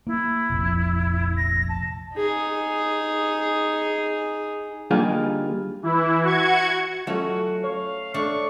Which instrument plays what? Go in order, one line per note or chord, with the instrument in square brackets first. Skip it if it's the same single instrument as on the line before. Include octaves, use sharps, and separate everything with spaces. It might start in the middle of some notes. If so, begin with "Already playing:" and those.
[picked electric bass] A#3 [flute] E4
[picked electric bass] F1 A#1 F2
[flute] A#6
A5
[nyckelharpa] D#4 G#4
[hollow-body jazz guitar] D3 G3 A#3 D#4 F4 G#4
[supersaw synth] E3 E4
F#4 C#6 G#6
[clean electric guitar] F#3 F4 [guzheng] A3 C#4 [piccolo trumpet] F#4
[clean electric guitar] C#5 [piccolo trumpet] F5
[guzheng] A3 D4 [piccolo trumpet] C#6